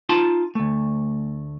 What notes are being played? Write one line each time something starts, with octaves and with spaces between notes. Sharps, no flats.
D#4 F4 A5 C6
D2 A3